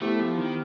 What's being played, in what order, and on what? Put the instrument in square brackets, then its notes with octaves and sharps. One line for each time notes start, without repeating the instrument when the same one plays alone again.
[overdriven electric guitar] A3 [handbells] B3 E4 G4 C5
[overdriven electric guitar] F3
D#3